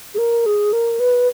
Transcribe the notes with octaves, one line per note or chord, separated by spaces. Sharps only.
G#4
A#4
G#4
A#4
B4